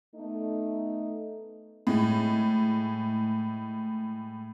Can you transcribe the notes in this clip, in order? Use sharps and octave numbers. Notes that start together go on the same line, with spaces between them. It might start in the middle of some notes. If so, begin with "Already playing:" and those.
A3 B3 D#4
A2 G#3